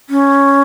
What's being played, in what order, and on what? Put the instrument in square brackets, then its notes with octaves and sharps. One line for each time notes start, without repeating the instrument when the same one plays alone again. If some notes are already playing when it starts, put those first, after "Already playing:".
[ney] C#4